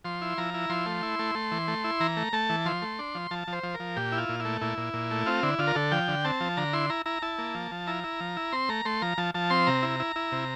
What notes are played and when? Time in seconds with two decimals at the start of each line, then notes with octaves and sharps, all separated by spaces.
0.05 F3 C6
0.22 E4
0.38 F3 A#5
0.54 E4
0.70 F3 C6
0.86 A3
1.03 E4
1.19 A3
1.35 A3
1.52 E3
1.68 A3
1.84 E4
2.00 E3 A#5
2.17 A3
2.33 A3 A5
2.49 E3
2.66 F3 C6
2.82 A3
2.99 D4
3.15 F3
3.31 F3 A5
3.48 F3
3.53 C5
3.63 F3
3.74 A#4
3.80 F3
3.97 A#2 G4
4.12 E4
4.18 F4
4.29 A#2
4.40 E4
4.45 A3
4.61 A#2 E4
4.77 A#2
4.94 A#2
5.11 A3
5.26 C4 F4
5.43 D3 E4
5.59 D3 F4
5.67 A#4
5.75 D3 A4
5.91 F3 G5
6.08 D3
6.24 C4 A5
6.40 F3
6.57 D3 A#5
6.73 E4 C6
6.90 E4 A#5
7.06 E4 A#5
7.22 E4 A5
7.39 A#3
7.55 F3
7.71 F3
7.87 E4 A#5
8.04 E4
8.20 F3
8.37 E4
8.52 C4 C6
8.69 A3 A#5
8.85 A3 C6
9.02 F3 A#5
9.18 F3 A5
9.34 F3 A5
9.50 C4 C6
9.67 C3 A#5
9.83 E4
10.00 E4
10.16 E4
10.32 C3